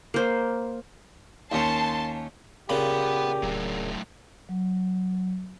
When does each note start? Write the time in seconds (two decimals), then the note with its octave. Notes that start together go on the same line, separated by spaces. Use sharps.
0.14 A#3 C5
1.52 D#2 C#4 A5 C6
2.70 A#2 C#3 G4 F#5 B5
3.43 D1 A2 F#3
4.49 F#3